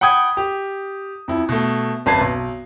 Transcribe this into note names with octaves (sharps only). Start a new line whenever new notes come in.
F#5 G5 B5 D#6 G#6
G4
F2 E4
B2 A3
G#1 F#2 B4 A5 G#6 C7
B1